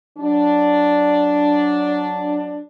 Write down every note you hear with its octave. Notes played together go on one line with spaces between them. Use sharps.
F#3 D4